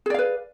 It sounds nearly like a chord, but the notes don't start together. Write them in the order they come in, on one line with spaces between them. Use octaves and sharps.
G#4 D5 F5 B4